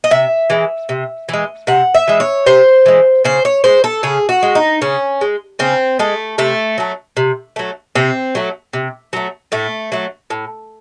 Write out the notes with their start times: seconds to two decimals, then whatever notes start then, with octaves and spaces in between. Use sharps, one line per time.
0.04 D#5
0.11 C3 E5
0.50 E3 G#3
0.89 C3
1.29 E3 G#3
1.67 C3 F#5
1.94 E5
2.08 E3 G#3
2.20 C#5
2.46 C3 C5
2.86 E3 G#3
3.24 C#3 C5
3.45 C#5
3.64 G#3 C5
3.84 A4
4.03 C#3 G#4
4.29 F#4
4.43 G#3
4.55 D#4
4.81 C#3 C#4
5.21 G#3
5.59 C#3 C4
5.99 G#3 A3
6.38 C3 A3
6.78 F#3 A3
7.17 C3
7.56 F#3 A3
7.95 C3 C4
8.35 F#3 A3
8.73 C3
9.13 F#3 A3
9.52 A2 A3
9.92 F#3 A3
10.30 A2